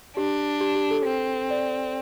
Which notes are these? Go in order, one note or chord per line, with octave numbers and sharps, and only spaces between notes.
D4 G4
G4
G4
A4
C4
D5